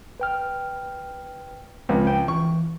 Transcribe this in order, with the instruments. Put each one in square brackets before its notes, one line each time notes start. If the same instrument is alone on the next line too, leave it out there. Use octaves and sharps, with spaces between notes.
[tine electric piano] B4 G5 F6
[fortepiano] C#2 [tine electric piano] F3 G#3 C4
[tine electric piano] G5
[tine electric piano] E3 [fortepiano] C#6